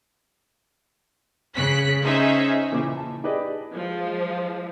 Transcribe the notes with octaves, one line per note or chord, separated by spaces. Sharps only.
C#3 F#6 B6
C#4 D#4 G#4 C5 E5
A#2 C#3 E3 E4 D6
A5
E4 G4 G#4 B4 D5 D#5
F3 G#3